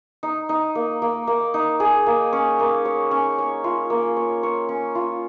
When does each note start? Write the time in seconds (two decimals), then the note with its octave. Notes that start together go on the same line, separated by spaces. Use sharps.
0.23 D#4
0.49 D#4
0.75 A#3
1.02 A#3
1.27 A#3
1.54 D#4
1.80 G#4
2.06 A#3
2.33 C#4
2.59 A#3
2.85 C#5
3.11 C#4
3.38 C#5
3.64 F4
3.90 A#3
4.16 C#5
4.43 C#5
4.69 C#4
4.95 F4